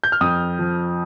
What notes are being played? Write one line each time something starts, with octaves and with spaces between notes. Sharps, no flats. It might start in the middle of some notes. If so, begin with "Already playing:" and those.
G6
F6
F2 D#6
F3